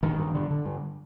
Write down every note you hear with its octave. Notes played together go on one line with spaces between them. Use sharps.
G2 D#3
G2
D3
D3
G2